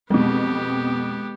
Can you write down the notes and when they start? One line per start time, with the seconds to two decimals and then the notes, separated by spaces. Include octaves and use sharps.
0.10 F2 B2 G#3 B3 C4 G4